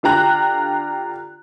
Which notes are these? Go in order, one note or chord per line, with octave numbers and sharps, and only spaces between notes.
D3 F4 G4 A#5 F#6